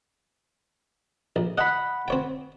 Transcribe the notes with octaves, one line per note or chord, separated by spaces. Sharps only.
A#1
D#5 F#5 B5
C4 C#5 G5